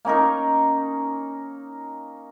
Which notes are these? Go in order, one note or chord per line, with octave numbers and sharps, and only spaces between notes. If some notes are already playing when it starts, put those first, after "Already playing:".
A#3 C#4 D#4 A#4